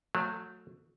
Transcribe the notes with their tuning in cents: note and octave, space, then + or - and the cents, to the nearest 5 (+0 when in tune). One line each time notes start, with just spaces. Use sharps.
F#3 -25 A3 +20